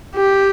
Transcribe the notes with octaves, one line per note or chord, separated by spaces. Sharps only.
G4